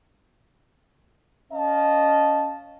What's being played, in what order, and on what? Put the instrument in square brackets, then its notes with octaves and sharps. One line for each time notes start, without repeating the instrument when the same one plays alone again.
[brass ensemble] C#4 D#5 F5 A5